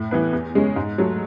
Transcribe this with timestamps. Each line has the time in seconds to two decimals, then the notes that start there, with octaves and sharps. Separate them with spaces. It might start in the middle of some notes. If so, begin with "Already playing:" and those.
Already playing: A2
0.11 E3 B3 E4 B4
0.33 E2
0.55 C#3 G#3 C#4
0.76 G#2
0.98 F#3 A3